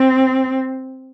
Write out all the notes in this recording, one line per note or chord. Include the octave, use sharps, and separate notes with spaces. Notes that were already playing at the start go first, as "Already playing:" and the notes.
Already playing: C4